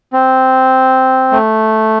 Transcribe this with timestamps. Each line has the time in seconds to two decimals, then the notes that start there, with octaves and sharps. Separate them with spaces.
0.13 C4
1.32 A3